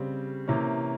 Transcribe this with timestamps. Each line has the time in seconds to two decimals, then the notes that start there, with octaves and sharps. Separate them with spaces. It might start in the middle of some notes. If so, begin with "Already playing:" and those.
Already playing: C#3 G3 C4
0.48 C3 E3 A#3 C#4